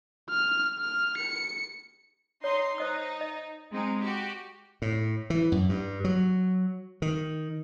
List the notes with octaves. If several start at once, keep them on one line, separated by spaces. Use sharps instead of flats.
F6
F6
C#7
D#4 C#5 C6
D#4 C5 D#5 D#6
D#5
G#3 C4 D#4
F#4 G4
A2
E3
F#2
G2
F#3
D#3